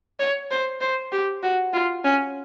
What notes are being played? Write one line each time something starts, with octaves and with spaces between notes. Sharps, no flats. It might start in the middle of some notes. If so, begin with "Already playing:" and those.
C#5
C5
C5
G4
F#4
F4
C#4